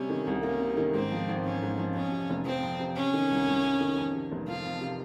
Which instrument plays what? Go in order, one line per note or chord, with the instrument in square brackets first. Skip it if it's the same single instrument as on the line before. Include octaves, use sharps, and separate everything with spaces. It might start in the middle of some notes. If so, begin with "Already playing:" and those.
Already playing: [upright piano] C3 G3 [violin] C#4
[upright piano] D#3
C2
[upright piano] A#3 [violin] C#4
[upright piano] C3
D#3
[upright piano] G#2 [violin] C4
[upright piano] F3
G#1
[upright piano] C4 [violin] C#4
[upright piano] G#2
F3
[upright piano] F2 [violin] C#4
[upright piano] C3
F1
[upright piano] F3 [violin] C4
[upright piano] F2
C3
[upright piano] C3 [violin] C#4
[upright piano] D#3
C2
C2
C3
D#3
F2
C3
F1
[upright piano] F3 [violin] F4
[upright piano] F2
C3